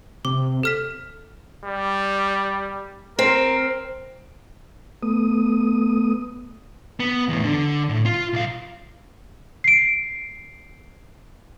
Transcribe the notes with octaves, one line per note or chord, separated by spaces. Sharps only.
C3 D6
A4 F6 B6
G3
C4 A#4
A3 B3 D#6
B3
E2 A2
D3
A2
F4
B1 F5
C7 D7